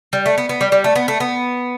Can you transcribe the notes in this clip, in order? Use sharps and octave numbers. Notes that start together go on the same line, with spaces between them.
G3
A3
B3
B3
G3
G3
A3
B3
A3
B3